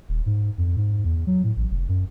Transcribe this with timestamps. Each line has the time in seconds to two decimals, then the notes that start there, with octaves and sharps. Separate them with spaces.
0.09 D#1
0.26 G#2
0.58 F2
0.77 G#2
1.05 E2
1.27 F#3
1.44 A2
1.57 A1
1.70 F1
1.89 F#2